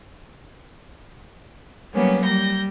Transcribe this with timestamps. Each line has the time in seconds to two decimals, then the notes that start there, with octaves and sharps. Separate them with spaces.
1.93 F#3 G3 A#3 B3 C#4
2.25 G3 G6 A#6